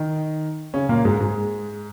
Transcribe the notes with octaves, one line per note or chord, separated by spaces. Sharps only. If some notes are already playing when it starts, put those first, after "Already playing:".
Already playing: D#3 D#4
C#3 C#4
A#2 A#3
G#2 G#3
G#2 G#3